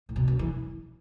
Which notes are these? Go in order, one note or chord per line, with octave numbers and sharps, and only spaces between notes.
A2
B2
F#2
E3